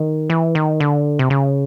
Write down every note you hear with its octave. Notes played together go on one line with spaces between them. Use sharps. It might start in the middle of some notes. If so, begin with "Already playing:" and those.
Already playing: D#3
E3
D#3
D3
C3
C#3